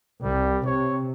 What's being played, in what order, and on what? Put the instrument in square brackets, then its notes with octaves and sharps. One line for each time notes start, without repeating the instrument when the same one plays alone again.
[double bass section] C2 [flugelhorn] G3
[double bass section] C3 [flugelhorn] C#5